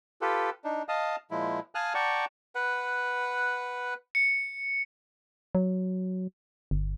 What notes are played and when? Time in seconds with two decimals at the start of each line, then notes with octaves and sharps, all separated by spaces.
0.21 F4 G4 A4 B4
0.64 D4 D#4
0.88 D#5 F5 A5 D#6
1.31 A#2 F3 G#3 E4
1.75 F5 G#5 A5 D#6 F6 F#6
1.94 D5 F#5 G5 A5 A#5 C#6
2.55 B4 F#5
4.15 C#7
5.55 F#3
6.71 G1